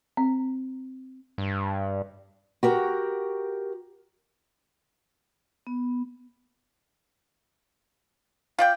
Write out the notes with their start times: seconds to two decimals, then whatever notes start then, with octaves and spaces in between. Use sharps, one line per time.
0.17 C4
1.38 G2
2.63 F#4 G4 A#4
5.67 B3
8.59 F4 D5 F5 G5